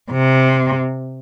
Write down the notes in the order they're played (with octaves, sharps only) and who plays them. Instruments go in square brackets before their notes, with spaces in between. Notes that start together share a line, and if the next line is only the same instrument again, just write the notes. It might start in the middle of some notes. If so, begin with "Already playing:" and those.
[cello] C3